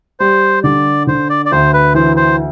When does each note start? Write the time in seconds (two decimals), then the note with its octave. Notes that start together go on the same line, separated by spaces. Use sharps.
0.20 G3 C5
0.64 D3 D5
1.07 D3 C5
1.30 D5
1.46 D5
1.52 D2 C5
1.73 B4
1.94 E3 C5
2.16 C5